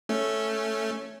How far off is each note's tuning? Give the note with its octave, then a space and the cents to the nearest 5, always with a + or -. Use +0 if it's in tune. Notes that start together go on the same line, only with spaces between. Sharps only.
A3 +0 C#4 +0